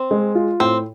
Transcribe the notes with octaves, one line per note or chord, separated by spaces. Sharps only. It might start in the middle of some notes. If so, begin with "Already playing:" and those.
Already playing: C4
G#3
F4
A2 C4